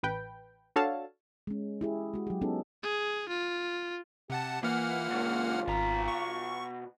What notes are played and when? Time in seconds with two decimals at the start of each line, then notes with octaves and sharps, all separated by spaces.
0.03 A1 B4 G5
0.76 D4 F#4 A4 C#5 F5 A5
1.47 G#3 C#4
1.81 E4 G4 G#4
2.14 G#3 F#4
2.27 F#3 G4
2.41 B3 C#4 D#4 G#4 A4
2.83 G#4
3.29 F4
4.30 C3 G4 F#5 A5
4.63 E3 A#3 F4 F#5 F6
5.10 C#2 F#2
5.68 G#1 B2 A#5
6.08 C#6